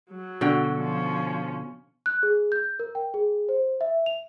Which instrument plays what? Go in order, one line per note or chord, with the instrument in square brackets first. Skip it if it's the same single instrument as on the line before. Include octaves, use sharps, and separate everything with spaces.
[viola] F#3
[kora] B2 D3 G5
[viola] F3 C#4
[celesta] F#6
G#4
G6
A#4
G5
G#4
C5
E5
F7